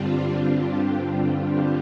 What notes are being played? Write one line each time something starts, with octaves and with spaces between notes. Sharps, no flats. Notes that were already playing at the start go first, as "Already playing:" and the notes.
Already playing: G2 D3 G3 C4 D4 F4
F4
G4
F4
D4